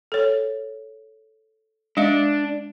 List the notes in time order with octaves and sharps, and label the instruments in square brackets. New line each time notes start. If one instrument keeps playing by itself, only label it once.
[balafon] A4 C#5
[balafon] G#3 D#5 F5 [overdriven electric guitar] D4